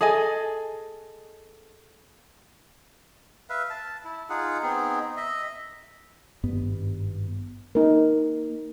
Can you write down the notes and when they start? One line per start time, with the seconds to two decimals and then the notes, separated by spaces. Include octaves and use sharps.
0.01 G#4 A4 D#5 G#5
3.50 B4 E5 F5
3.70 A5
4.05 E4
4.30 D#4 F4 G#4 F#5
4.63 B3 C4 D#4 G#4
5.17 D#5 E5
6.43 G#1 G2 B3
7.75 A#3 D#4 A#4